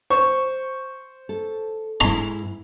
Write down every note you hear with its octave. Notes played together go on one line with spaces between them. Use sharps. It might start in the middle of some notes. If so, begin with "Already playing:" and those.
C5 C#6
A4
G#2 E4 A#5 C6